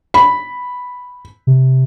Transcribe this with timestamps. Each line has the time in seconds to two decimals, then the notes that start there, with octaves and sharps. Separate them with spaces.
0.14 B5
1.47 C3